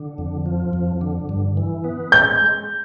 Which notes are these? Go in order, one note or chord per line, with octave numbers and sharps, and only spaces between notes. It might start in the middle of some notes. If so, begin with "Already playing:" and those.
Already playing: D3
F2
F3
F2
D3
G2
E3
B3
G#3 G6